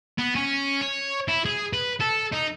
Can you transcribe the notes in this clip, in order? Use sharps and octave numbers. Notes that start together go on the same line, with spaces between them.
B3
C#4
C#5
E4
G#4
B4
A4
D#4